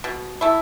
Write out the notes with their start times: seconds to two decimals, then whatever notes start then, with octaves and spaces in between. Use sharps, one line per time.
0.04 B2
0.41 A3 E4